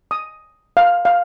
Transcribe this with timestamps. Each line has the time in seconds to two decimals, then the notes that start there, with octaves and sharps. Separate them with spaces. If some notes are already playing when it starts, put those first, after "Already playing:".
0.11 D#6
0.77 F5
1.05 F5